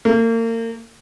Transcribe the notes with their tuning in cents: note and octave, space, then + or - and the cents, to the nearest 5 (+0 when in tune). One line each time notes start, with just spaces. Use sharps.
A#3 -35